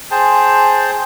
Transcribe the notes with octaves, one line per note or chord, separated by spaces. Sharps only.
G#4 C5 G5 A5